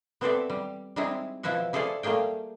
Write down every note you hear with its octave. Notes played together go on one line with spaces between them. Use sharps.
B3 C4 A4 C5 D5 E5
G3
G3 G#3 C4 D#4 E4 G#4
B2 F3 E4 B4 E5 F#5
E4 G#4 A4 C5 D5 F5
G3 A3 A#3 G#4 G5